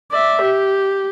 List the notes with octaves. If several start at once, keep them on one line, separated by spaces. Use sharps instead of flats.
D5 E5
G4